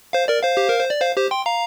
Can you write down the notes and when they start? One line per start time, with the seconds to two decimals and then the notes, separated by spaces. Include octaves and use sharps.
0.13 C5 F5
0.28 A#4 D5
0.43 C5 F5
0.57 G4
0.69 A#4
0.79 C5
0.90 D5
1.01 C5 F5
1.16 G4 C5
1.31 G5 C6
1.46 F5 A#5